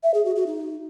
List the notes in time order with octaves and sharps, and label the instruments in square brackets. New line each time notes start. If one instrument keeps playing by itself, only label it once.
[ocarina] E5
G#4
F#4
F#4
D#4